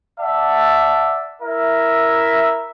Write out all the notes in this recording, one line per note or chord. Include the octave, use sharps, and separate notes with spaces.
D5 E5 F#5 A5
E4 A#4 E5